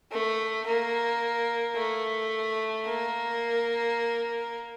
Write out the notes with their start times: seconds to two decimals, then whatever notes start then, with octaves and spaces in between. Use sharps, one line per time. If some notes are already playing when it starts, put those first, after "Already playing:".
0.12 A3
0.66 A#3
1.76 A3
2.85 A#3